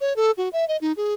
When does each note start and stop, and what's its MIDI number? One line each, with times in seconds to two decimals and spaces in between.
0.01 0.13 73
0.16 0.31 69
0.37 0.49 66
0.53 0.67 76
0.68 0.77 75
0.81 0.92 63
0.97 1.14 68